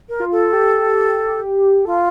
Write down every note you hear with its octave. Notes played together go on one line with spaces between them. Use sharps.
A#4
F4
A4
G4
F4 A4